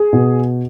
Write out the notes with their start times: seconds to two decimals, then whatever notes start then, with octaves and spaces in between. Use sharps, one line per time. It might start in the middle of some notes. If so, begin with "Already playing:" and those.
Already playing: G#4
0.13 B2